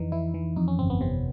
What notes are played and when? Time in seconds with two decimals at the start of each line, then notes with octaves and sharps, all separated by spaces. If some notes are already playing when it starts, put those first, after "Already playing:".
Already playing: F2 E3 D#4
0.12 E3 E4
0.34 E3
0.56 F2 D#4
0.68 C#4
0.79 G1 C4
0.90 B3
1.01 C3 C4